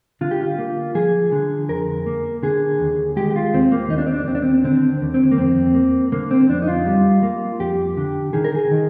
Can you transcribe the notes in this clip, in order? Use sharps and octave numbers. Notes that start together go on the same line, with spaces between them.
D3 F4
G4
F4
A#3
F3 G#4
D3
F2 A#4
A#3
D3 G#4
D#2
G#3 G4
G4
F4
D#2 C4
A#3
D#2 D#4
D4
C4
D4
D#2 C4
D4
C4
D3 C4
D#2
C4
A#3
F2 C4
A#3
D3 A#3
C4
F2 D4
D#4
F4
G3
A#3
F2 G4
D3
D#3 G#4
A#4
G#4
D#3